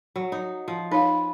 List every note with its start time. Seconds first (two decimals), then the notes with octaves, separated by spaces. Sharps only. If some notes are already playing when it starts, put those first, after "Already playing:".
0.16 F#3
0.32 D#4
0.68 F3
0.91 D#4 B4 C#5 F5